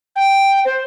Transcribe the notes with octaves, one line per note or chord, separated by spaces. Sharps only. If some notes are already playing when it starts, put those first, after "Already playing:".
G5
C5